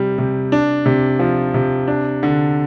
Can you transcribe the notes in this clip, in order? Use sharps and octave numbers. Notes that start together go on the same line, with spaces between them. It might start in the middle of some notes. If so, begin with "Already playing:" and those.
Already playing: C3 G3
C3
D4
C3
F3
C3
D4
D3